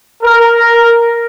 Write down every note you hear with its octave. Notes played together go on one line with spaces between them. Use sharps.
A#4